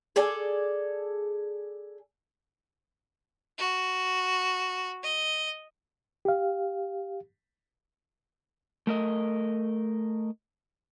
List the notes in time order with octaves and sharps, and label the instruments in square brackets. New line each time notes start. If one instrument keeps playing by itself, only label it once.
[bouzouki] G#4 A4 D5 G#5
[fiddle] F#4
D#5
[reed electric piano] G4 F5
[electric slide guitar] A3 A#4 D#5